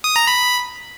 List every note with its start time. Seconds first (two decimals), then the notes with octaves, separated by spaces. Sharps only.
0.04 D#6
0.16 A#5
0.27 B5